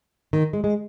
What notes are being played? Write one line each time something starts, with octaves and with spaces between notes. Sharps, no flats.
D#3
G#3
G#3